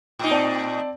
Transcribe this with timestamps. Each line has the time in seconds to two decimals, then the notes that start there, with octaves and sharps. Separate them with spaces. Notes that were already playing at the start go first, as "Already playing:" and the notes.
0.19 A2 D#4
0.31 C4 D5 A5